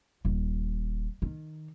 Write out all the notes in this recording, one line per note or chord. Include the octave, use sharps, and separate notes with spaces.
D#1
D#3